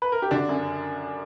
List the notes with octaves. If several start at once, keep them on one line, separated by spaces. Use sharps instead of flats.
B4
A#4
G4
D3 D4 F#4
F#2